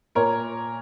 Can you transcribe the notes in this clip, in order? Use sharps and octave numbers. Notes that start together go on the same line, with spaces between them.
A#2 A#4 C#5